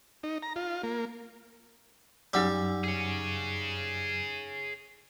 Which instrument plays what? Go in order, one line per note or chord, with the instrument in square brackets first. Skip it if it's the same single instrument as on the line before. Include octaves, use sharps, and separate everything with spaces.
[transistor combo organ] D#4
A#5
F4
A#3
[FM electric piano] F#2 F#3 [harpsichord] G3 [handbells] D#4 F#5 E6
[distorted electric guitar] G#4 C#5